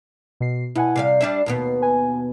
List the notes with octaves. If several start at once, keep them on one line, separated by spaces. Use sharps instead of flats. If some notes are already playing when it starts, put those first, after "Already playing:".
B2 C7
B2 E4 F#5 G#5
C3 G3 F5 C7
G3 D4 E5
D#2 B2 B3
B4 G#5